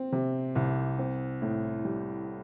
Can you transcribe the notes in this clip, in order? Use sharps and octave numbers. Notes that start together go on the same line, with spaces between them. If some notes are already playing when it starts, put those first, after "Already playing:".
Already playing: C4
C3
C2
C4
A2
G3